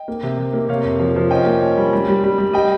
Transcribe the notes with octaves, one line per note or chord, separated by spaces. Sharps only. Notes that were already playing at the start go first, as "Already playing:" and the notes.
Already playing: D#5 G5
A#3
C3
C3
A#3
C3 C#5 F5
F2
F3
F3
C#4 D#5 G5
A#3
C#4
G3
G3
G3
G3
G3
G3 D#5 G5